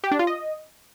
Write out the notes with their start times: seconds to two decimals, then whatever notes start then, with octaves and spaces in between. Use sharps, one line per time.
0.04 G4
0.11 D4
0.19 F4
0.27 D#5